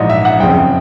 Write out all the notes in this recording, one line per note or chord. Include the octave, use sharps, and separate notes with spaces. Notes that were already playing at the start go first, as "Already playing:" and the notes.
Already playing: A#1 G#2 E3 D#5
E5
F#5
F#1 F2 C#3 G5